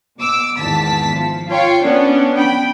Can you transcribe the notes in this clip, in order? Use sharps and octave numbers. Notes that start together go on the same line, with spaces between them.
B2 D6 E6
G#1 E2 A5 B6
F3
F4 C#5 F5 G5
B3 C#4 D4
G5 B5